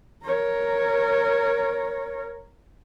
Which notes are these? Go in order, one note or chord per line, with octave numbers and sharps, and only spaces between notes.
A#4 C#5